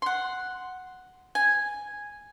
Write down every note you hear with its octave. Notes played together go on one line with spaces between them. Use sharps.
F#5 C6
G#5